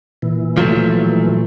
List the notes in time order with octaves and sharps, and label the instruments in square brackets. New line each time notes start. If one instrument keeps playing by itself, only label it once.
[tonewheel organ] A#2 E3
[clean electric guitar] F3 F#3 A3